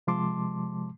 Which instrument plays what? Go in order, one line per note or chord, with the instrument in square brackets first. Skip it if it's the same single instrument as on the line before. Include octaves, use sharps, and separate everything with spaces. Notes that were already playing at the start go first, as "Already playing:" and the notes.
[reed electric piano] C3 F3 G#3 A5 C6 D6